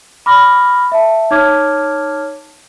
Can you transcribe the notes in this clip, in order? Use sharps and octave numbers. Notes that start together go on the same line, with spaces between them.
B5 D6 F6 A#6
E5 A5
D#4 C#5 A5 D6 F6 G#6